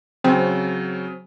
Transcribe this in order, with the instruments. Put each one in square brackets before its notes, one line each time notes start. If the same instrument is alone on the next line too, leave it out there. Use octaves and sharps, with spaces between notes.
[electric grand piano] C#3 F#3 [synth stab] C4